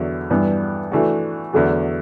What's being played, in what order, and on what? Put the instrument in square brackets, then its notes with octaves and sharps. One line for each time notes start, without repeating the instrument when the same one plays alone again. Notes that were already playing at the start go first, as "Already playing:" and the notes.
Already playing: [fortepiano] E2 D3 F#3
G2 E3 G3 B3 D4
E3 A3 D4 F#4
E2 D3 F#3 A3